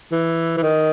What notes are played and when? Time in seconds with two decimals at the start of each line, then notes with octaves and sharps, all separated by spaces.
0.12 E3
0.57 E3
0.63 D#3